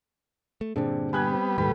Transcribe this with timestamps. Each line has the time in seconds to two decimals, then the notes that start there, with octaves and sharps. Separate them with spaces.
0.61 A3
0.76 G2 A#2 D3 C4 D4 G#4
1.13 G3 B3 G#5 F#6 G#6
1.30 C4
1.58 D#1 D2 A2 D#3 G3 A4 B4